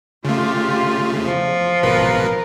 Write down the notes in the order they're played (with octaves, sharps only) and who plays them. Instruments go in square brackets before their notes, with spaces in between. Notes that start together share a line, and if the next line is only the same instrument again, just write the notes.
[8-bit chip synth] C#3 A3 [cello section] F4 G4
[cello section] E2 [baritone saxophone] F3
[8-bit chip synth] G#1 B2 B4 [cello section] A#4